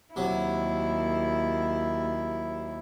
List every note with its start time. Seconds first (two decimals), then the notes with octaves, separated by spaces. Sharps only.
0.16 D#2 C3 F#3 E4